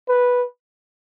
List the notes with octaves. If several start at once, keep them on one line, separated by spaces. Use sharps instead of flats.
B4